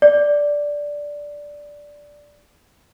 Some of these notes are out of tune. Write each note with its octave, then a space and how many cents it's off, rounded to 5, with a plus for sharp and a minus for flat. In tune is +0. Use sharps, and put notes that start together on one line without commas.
D5 -5